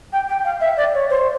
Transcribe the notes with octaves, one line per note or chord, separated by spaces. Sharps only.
G5
G5
F5
E5
D5
C#5
C5